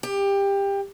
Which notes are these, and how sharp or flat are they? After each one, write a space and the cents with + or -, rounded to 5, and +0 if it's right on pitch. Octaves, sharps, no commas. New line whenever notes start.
G4 +20